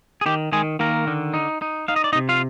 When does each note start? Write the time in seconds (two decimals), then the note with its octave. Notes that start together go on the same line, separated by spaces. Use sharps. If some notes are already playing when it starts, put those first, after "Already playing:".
0.21 G#4
0.26 D#3 G4
0.52 D#3 G#3 G#4
0.79 D#3 A#3 A#4
1.07 D3
1.34 D#4
1.62 D#4
1.88 D#4 F5
1.96 D#5
2.04 D5
2.13 D#4 D#5
2.15 C3
2.29 F4 F5